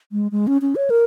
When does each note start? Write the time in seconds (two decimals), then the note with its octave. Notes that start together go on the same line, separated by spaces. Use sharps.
0.12 G#3
0.32 G#3
0.47 C#4
0.62 C#4
0.76 C#5
0.90 A#4